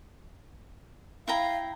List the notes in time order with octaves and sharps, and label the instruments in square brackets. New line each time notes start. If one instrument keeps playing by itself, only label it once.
[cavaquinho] E4 G5 A#5 [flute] F5